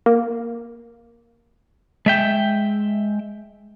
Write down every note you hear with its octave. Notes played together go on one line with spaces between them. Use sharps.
A#3
G#3 E5 G5